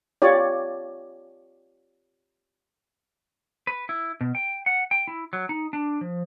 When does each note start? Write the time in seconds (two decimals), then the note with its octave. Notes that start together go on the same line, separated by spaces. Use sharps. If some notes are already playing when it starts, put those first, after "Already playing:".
0.22 F4 G4 C#5 D5
3.67 B4
3.89 E4
4.21 B2
4.35 G5
4.66 F#5
4.91 G5
5.08 E4
5.33 F#3
5.49 D#4
5.73 D4
6.01 F3